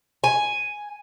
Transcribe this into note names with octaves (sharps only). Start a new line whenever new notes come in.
G#5